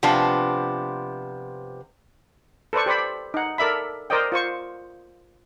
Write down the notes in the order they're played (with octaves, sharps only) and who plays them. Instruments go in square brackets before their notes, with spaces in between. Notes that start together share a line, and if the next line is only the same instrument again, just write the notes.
[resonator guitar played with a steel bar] C3 F3 B3 D4
[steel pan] A4 B4 C5 D5 C#6
G4 C5 D5 B5
D#4 F#5
A4 A#4 D5 E5 B5
A#4 C5 D5 D#5 G5
F4 C5 C#6